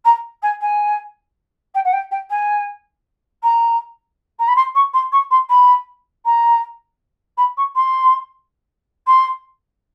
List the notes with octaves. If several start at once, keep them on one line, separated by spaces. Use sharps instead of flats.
A#5
G#5
G#5
G5
F#5
G5
G5
G#5
A#5
A#5
B5
C6
C#6
C6
C#6
C6
B5
A#5
B5
C#6
C6
C6